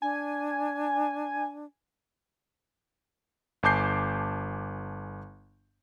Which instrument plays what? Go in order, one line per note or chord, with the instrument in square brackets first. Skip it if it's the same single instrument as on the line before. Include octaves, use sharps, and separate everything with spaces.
[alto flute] D4 [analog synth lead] G#5
[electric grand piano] G1 G#5 A5 D6 G6 C7